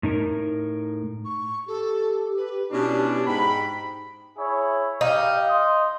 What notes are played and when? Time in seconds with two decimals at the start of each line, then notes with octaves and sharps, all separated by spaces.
0.03 A2 D#4 A#4
1.24 C#6
1.67 G4 A4
2.36 B4
2.71 B2 C#4 D4 E4
3.26 G#2 G5 B5
4.37 E4 G#4 C#5
5.01 D#4 G4 F5
5.48 C6 D#6